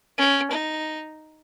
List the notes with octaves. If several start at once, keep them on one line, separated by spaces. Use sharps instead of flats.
C#4
D#4